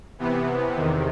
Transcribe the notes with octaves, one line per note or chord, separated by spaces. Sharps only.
C3 E3 B3
E2 C3 D#3